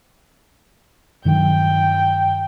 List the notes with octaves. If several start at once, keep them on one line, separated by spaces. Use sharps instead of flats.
G2 D#3 F#3 G5